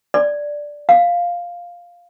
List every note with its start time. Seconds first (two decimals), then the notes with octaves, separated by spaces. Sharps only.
0.14 D5
0.89 F5